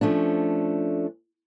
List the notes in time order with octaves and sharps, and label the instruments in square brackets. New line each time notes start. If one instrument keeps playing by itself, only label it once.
[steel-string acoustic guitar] F3 A3 C#4 D4